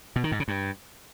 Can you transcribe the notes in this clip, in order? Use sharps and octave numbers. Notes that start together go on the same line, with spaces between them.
B2
D#3
G#2
C#3
G2